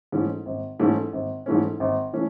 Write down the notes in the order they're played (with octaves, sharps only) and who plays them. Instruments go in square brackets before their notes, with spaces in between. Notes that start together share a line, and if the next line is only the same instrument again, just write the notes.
[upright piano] G#2 E3 A3 C#4
G#1
G#2 E3 A3 C#4
G#1
G#2 E3 A3 C#4
G#1
E3 A3 C#4